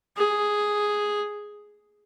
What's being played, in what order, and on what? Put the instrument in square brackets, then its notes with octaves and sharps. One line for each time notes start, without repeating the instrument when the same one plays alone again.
[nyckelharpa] G#4